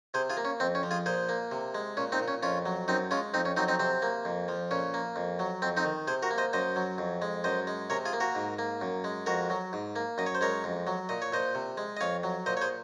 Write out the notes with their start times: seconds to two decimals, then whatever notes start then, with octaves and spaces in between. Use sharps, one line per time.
0.14 C3 G#4 C5
0.30 F4 G#4
0.37 A#3
0.45 C#4
0.60 F2 C4
0.75 C#4
0.83 F3
0.91 F4 G#4
1.06 A#2 G#4 C5
1.29 A#3
1.52 C3
1.75 G#3
1.97 A#2 C#4
2.12 C4 D#4
2.20 A#2
2.28 C#4
2.43 F2 C#4 F4
2.66 F#3
2.88 F#2 C4 D#4
3.11 G#3 C#4 F4
3.34 F2 C4 D#4
3.45 C#4
3.57 F#3 C4 D#4
3.68 C4 D#4
3.79 C3 C4
4.02 A#3
4.25 F2
4.48 F3
4.71 A#2 C#4
4.94 A#3
5.16 F2
5.39 F#3
5.62 F2 C4
5.77 C4 D#4
5.85 D#3
6.07 C3 G#4 C5
6.23 F#4 A#4
6.31 A#3
6.38 C5 D#5
6.53 F#2 C5 D#5
6.76 F#3
6.98 F2
7.22 G#3
7.44 F#2 C5 D#5
7.67 G#3
7.90 C3 A#4 C#5
8.06 F4 G#4
8.13 A#3
8.20 F#4 A#4
8.35 G#2
8.59 A#3
8.81 F#2
9.04 G#3
9.26 F2 F#4 A#4
9.50 F#3
9.73 G#2
9.96 A#3
10.18 F#2 D#5
10.26 C#5
10.35 C5
10.41 G#3 A#4 C#5
10.64 F2
10.87 F#3
11.09 A#2 D#5
11.22 C#5
11.32 A#2 C5 D#5
11.55 C3
11.77 G#3
11.97 D#5
12.01 F2 C#5 F5
12.23 F#3
12.46 A#2 C5 D#5
12.57 C#5
12.61 G#4 C5